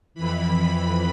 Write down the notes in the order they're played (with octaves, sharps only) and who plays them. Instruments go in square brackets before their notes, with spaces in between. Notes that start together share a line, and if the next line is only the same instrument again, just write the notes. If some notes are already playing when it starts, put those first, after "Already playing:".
[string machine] F2 E3 B5